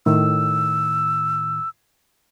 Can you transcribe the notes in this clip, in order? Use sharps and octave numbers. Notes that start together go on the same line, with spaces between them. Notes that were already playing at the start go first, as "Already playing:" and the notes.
A2 D#3 E6